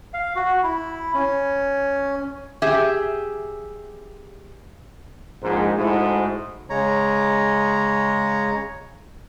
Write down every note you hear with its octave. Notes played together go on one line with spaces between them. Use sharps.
F5
F#4
E4
C#4
G4 G#4 E5
A#1 G#2
G#2 A3 E4 F#4 G#4 C5
C#3 G#3 C#5 A#5